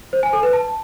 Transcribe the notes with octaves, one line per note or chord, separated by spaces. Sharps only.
C5
G#5
A4
B4
A5